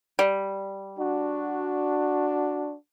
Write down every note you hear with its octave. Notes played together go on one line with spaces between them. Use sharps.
G3
D4 F#4